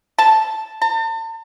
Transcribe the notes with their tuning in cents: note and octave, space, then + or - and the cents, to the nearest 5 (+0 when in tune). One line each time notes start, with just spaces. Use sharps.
A5 -5
A5 +40